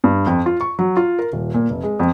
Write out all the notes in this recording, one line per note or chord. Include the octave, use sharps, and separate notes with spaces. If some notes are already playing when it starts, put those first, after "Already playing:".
G2
F2
F4
C#6
F#3
F4
A#4
D#1
A#2
F1
G#3
F2